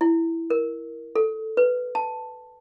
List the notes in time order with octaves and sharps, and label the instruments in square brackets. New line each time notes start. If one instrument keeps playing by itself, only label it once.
[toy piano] E4
A#4
A4
B4
A5